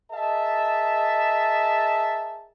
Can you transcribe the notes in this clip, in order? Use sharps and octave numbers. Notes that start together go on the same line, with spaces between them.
G#4 A#4 D#5 E5 A5